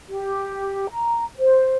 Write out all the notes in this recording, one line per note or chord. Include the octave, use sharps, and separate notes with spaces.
G4
A#5
C5